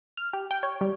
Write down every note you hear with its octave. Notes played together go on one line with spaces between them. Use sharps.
F6
G4
G5
C#5
G3